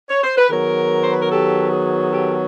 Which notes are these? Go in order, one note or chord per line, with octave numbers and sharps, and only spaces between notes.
C#5
C5
B4
D#3 F#3 B3 G#4 A#4
C5
B4
A#4
G4 A4
F#4 G#4
G#4
G4 A4